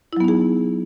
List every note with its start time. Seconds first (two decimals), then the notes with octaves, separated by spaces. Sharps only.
0.13 E4
0.17 F#3
0.20 B3
0.24 D#4
0.28 G#4